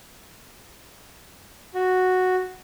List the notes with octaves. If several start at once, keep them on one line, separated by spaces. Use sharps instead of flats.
F#4